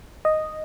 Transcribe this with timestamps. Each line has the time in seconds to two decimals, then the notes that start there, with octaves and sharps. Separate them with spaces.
0.25 D#5